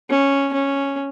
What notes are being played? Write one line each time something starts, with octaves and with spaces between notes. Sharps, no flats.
C#4
C#4